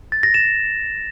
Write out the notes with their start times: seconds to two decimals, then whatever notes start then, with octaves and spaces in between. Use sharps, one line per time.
0.12 A6
0.23 A#6
0.34 E7